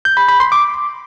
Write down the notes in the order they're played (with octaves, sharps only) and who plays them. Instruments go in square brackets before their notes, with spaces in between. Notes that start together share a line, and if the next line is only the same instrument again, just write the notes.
[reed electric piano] G6
B5
B5
C6
D6